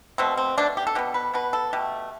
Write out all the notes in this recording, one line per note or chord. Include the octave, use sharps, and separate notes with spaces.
B2 A3 C4
C4
B2 A3 D4
G4
A4
B2 B3 G4
B4
B2 B3 B4
A4
B2 A3 G4